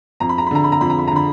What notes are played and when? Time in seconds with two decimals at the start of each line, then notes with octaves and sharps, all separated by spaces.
0.20 F2 A#5
0.29 B5
0.38 A#5
0.47 B5
0.51 D3 A#5
0.64 B5
0.72 A#5
0.81 F2 B5
0.90 A#5
0.99 B5
1.08 A#5
1.11 D3 B5